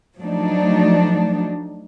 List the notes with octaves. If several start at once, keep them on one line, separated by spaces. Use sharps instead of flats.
F3 F#3 A3 D4 D#4